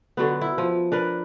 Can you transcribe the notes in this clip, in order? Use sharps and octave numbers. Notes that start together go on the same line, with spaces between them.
D3 F#3 B3
E4
F3
D4 A#4 B4